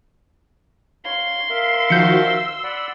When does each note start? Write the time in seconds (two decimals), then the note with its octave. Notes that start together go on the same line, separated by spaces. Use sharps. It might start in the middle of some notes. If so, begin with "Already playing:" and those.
1.05 C#5 F5 C6
1.50 A#4 E5 F5
1.90 D#3 F3 F#4 G6 C#7
2.22 E6
2.64 D5 F#5 B5